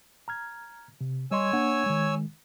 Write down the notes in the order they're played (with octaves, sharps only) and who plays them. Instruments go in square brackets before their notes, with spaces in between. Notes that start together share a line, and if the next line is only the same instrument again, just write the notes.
[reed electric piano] A#5 F6 G#6
C3
[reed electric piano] G3 D#5 C6 [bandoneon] C#5 G#5 E6
[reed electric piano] A#3 D4 F#5
D#3 G#3